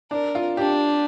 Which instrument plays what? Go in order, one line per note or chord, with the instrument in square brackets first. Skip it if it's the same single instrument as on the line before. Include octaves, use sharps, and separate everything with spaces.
[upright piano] D4 [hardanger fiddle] A#4
[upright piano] F4
[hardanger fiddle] D4 [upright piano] G4